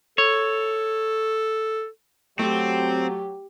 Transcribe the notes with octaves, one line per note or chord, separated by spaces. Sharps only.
A4 C#5
F#3 A3 C4 G4